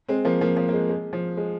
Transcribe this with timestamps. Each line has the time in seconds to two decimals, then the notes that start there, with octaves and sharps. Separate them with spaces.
0.08 G#3 C4
0.25 F3 A#3
0.41 F3 A#3
0.57 F3
0.69 A#3
0.73 G#3
0.89 G#3
1.13 F3
1.37 G#3